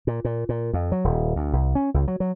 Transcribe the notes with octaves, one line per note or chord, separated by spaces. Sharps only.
A#2
A#2
A#2
F2
F#3
D#1
D2
C2
C#4
C#2
F#3
F#3